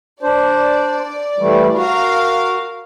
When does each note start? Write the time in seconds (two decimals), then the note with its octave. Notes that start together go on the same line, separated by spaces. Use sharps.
0.23 D4 C5 D5
1.38 E3 G3 A3
1.75 F#4 A#4 F5